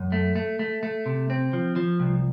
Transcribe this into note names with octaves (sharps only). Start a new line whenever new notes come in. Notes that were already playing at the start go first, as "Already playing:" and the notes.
Already playing: F#2
A3
A3
A3
A3
C3
C4
F3
F3
C2